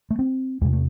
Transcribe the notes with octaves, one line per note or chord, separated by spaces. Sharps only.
A3
C4
E2 C3 G#3
A3